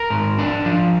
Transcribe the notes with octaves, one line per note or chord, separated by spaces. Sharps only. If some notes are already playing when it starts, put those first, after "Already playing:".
Already playing: A#4
G#2
D4
F3